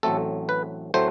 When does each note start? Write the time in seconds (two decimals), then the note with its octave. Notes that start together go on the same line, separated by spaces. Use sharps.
0.03 A1 A2 F#3 A3 C4 A4
0.49 B4
0.94 A2 F#3 A3 C4 C5